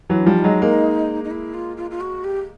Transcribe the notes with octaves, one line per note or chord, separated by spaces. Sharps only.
E3 F#3
D4
F3 G3
D#4
F#3 G#3
G#3 A#3
D#4
E4
F4
F4
F4
F#4
G4